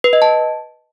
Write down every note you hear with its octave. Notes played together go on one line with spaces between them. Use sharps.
B4
D#5
A5